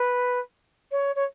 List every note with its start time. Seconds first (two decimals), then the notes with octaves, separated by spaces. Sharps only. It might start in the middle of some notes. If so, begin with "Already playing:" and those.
Already playing: B4
0.91 C#5
1.16 C#5